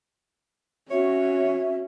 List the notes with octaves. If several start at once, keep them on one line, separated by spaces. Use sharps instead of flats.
C#4 F#4 C#5 E5